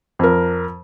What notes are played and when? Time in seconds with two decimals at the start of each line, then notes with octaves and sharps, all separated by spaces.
0.19 F2 A#4